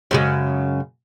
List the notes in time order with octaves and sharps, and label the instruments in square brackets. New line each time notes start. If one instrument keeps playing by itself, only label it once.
[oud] F#2 C#3 G#3